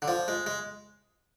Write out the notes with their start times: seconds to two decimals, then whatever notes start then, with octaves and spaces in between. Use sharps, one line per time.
0.02 D3
0.08 F3
0.28 G#3
0.46 G#3